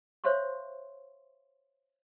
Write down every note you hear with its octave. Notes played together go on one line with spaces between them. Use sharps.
C5 C#5 E5 F5 C6 C#6